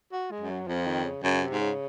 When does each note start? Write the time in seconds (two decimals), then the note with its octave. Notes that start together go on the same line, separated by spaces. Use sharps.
0.12 F#4
0.31 G#3
0.40 F#2
0.50 F#3
0.67 F2 F3
0.86 D#3
1.04 C#3
1.23 F#2 C#3
1.42 C3
1.51 G#2
1.60 C#3